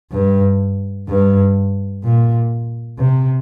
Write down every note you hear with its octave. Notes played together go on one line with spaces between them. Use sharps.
G2
G2
A#2
C3